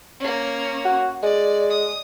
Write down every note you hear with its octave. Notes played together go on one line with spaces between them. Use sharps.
A#3 C#4
F#4
G#3 D5
D#6